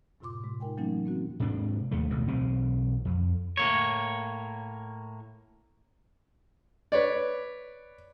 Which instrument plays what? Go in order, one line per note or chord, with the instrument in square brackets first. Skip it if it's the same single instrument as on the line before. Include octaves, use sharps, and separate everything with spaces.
[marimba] F#2 A2 C3 F4 C6 D6
G2 C3 G#3
D#4 F4 A#4 G5 G#5
E3 F#3 A3 A#3 C#4 D#4
A#3 C4 F#4
[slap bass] G#2 C3 C#4 D4
D#2 G#3 A3
A1 D2 B2
B1 E3 C4
F2
[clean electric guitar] A2 A#3 C#5
[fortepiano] B4 C#5 D5